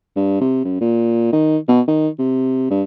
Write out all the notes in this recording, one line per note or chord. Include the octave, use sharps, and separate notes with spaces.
G2
C3
F#2
A#2
D#3
B2
D#3
C3
G2